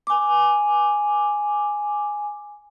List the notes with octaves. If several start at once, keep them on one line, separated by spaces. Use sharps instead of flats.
G#5 D6